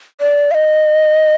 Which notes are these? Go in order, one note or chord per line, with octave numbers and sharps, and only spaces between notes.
D5
F5
D#5